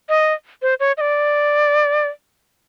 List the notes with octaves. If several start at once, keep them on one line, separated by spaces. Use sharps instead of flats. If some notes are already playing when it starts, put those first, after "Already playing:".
D#5
C5
C#5
D#5
D5